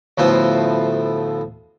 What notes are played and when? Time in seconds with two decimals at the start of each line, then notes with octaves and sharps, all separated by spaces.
0.18 D2 A2 F3 B3 C5 C6